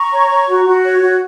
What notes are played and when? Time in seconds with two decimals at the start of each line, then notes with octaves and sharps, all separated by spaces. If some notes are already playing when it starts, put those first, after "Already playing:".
Already playing: A#5 C#6
0.11 C#5
0.30 C#5
0.48 F#4
0.65 F#4
0.83 C#5
1.01 F#4